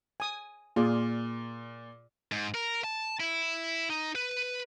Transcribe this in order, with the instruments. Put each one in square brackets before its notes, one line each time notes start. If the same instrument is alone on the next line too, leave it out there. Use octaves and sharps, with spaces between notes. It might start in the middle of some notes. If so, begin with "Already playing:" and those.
[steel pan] G#5 D#6
[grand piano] A#2 [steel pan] F4 G#4 D5
[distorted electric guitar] G#2
A#4
A5
E4
D#4
B4